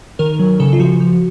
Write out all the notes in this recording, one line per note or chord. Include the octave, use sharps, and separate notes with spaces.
D#3 A#4
F#3
C#3 A4
F4
F3 F#4
F3